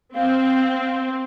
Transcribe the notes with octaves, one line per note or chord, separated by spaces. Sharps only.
C4 F5